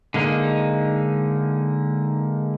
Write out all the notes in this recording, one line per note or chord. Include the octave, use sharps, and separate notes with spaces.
D3 G#3 A#3 D#4